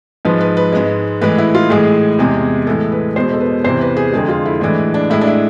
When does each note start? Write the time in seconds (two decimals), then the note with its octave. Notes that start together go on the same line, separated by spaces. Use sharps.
0.25 G#2 F3 G#3 B4
0.41 B4
0.57 B4
0.73 G#2 G#3
1.21 A2 E3 G#3 B4
1.38 E4
1.55 F4
1.70 A2 E3 G#3 G#4
2.19 E2 C3 G#3
2.67 A2 E3 G#3 A4
2.92 B4
3.16 E2 B2 G#3 C5
3.34 A4
3.40 B4
3.64 E2 C3 E3 C5
3.81 B4
3.97 G#4
4.12 F2 D3 G#3 G#4
4.29 F4
4.45 E4
4.61 A2 E3 G#3 D4
4.94 D4
5.10 A2 G#3 E4
5.21 D4
5.27 E4